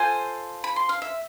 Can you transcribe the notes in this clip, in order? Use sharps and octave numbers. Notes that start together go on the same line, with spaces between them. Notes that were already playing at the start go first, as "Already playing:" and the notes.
Already playing: F4 A4 C5 G#5
B5
C6
F5
E5